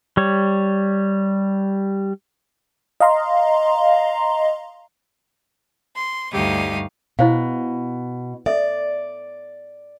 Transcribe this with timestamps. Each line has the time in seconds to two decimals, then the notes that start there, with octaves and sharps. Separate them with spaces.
0.17 G3 C#5
3.00 D#5 F5 A#5 C6
5.96 C6
6.32 D2 G2 D#4 G4 F5 D#6
7.19 B2 E4 C5 F5
8.46 A4 D5 E5